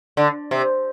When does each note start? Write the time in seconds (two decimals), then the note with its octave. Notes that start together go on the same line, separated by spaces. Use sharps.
0.17 D3
0.51 C3